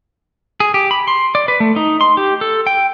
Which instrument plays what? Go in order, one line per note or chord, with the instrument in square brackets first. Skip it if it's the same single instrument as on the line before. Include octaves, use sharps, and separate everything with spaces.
[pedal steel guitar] G#4
G4
B5
C6
D5
B4
A3
D#4
C6
G4
A4
G5